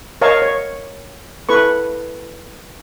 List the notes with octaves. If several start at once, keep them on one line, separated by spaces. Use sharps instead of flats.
A#4 C#5 D#5 F5 A5 C#6
C#5
E4 A4 B4 C#6